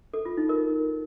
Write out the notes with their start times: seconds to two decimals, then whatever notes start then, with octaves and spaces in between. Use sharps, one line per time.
0.14 A4
0.25 F4
0.37 D#4
0.49 A#4